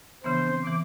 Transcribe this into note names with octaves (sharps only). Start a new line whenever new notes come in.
C#3 E3 F3 B3 D4 C5
C4
C3 E3 D6